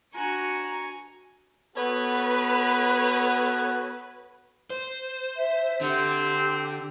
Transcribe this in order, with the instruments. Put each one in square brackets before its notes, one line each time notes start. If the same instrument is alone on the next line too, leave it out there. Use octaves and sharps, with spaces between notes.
[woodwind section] D4 A#5 [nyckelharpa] F#4 [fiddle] G#5 C#6
[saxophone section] B3 A4 C#5 [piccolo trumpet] F#4 [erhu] B4
[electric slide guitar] C5
[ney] E5
[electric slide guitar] D3 [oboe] C4 [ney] G4